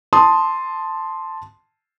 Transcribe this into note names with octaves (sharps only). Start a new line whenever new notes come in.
A5 C6 D#6